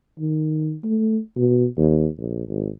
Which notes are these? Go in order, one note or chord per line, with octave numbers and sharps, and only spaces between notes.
D#3
A3
B2
D#2
A#1
G#1